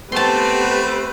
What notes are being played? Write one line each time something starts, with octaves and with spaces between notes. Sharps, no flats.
A3 B3 C4 G4 B4 A5 C6